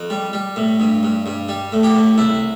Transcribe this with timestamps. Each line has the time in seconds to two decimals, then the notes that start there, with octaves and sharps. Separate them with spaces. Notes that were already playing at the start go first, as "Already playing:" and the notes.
Already playing: F2
0.10 G3
0.33 G3
0.56 A2
0.80 G2
1.03 G2
1.26 G2
1.49 G3
1.72 A2
1.83 G4
1.95 A2
2.18 C2 E4